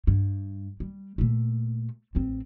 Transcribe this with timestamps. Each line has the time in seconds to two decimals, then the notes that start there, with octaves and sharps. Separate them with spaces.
0.07 G2
0.80 G3
1.18 A#2 A3
2.15 A1 C4